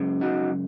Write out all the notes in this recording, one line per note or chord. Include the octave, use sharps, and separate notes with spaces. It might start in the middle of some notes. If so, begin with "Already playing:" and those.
Already playing: F#2 C#3 G#3
D#4 F#4